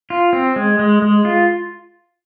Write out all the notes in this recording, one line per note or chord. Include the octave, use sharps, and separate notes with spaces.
F4
C4
G#3
G#3
G#3
F4